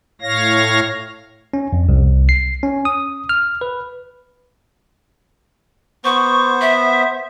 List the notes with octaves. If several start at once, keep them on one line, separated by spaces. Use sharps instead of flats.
A2 C#5 F5 A#6
C#4
F2
C2
C7
C#4
D#6
F6
B4
B3 C5 C#6
E5